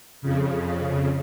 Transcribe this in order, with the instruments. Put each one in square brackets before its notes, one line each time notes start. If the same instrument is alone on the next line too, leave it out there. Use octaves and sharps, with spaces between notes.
[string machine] F2 C#3